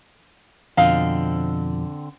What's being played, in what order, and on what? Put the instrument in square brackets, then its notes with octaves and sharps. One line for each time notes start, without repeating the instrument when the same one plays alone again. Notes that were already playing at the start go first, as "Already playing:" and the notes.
[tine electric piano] F2 B2 F3 [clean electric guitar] D3 C4 [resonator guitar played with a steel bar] D#5 F5